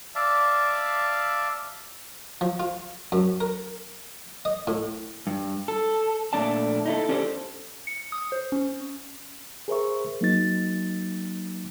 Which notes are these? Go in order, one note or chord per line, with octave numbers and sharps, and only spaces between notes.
D5 E5 F5 A5
F3
F4
F#2
A#4
D#5
A2
G2
A4
A#2 A3 A#3 D4 D5 A5
D#4 E4 A4
C#4 D4 G4 A4 A#4 C5
C#7
D#6
C5
C#4
G#4 A#4 C5 E5 C#6
F#3 A#3 D#4 A6